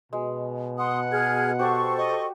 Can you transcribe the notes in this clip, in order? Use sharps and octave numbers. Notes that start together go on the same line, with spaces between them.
B2 G#3
F#5 C6 D#6
G#4 F6 G#6
F#4 G4 A4 C5 C#6
D#5